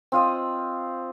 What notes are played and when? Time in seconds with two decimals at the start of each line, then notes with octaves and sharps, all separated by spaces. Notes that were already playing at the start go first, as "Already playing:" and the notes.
0.12 C4 F4 D#5